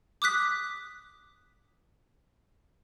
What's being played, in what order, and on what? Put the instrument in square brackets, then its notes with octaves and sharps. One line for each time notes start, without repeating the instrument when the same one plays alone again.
[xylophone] D6 D#6 F#6 B6